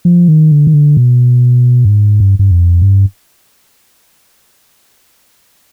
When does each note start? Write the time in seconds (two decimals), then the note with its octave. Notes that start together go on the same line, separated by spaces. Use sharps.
0.05 F3
0.28 D#3
0.52 D3
0.67 D#3
0.74 D3
0.97 B2
1.85 G2
1.89 G#2
2.20 G2
2.39 G2
2.51 F2
2.81 G2